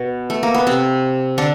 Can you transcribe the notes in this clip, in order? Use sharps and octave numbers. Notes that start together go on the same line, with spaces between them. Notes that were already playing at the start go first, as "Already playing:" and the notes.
Already playing: B2 B3
A3
A#3
B3
C3 C4
D3 D4